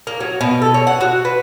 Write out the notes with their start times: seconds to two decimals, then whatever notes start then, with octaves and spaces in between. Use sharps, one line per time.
0.07 A#3
0.20 F#3
0.41 B2
0.62 A4
0.74 C#4
0.87 F#5
1.01 F#4
1.25 B4